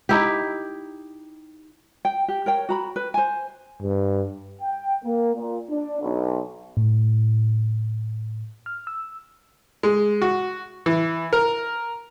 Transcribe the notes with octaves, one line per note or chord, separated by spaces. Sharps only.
D#4 E4 G4
G5
G4
A#4 C#5 G5
F#4 A#5 B5
B4
C5 G#5
G2
G5
A#3
A#2
D4
B1
A2
F6
E6
G#3
F#4
E3
A#4